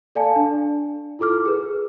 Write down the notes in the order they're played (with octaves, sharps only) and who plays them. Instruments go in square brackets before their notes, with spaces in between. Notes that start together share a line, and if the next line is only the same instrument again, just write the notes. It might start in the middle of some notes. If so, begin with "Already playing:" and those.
[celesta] A4 D5 F5 G#5 A5
D4
E4 F4 A4 D6 F6
G#4 B4